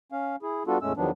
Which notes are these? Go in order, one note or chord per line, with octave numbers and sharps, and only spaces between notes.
C#4 F5
E4 G#4
G3 B3 D4 F4 F#4 A4
E2 A2 G#3 A3 C#4 E6
E2 D#3 F3 F#3 B3 D4